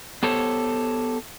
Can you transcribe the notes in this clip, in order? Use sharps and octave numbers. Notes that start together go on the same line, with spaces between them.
B3 G4 A4 C5 C#5